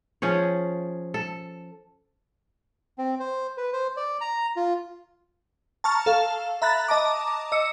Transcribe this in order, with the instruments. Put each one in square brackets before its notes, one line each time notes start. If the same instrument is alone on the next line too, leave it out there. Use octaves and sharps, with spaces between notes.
[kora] F3 C#4 G#4 C#5
A4
[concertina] C4
C5
B4
C5
D5
A#5
F4
[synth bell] A5 A#5 C#6 F6
A4 F5
E5 A#5 B5 F#6 A6
D#5 A5 A#5 D6
D#5 E6 C#7